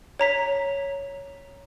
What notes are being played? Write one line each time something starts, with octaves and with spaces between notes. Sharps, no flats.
C#5 A#5 B6